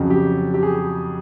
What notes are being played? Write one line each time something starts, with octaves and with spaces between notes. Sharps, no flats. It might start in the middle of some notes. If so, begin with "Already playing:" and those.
Already playing: F2 C#3 F#3
G4
G4
G#4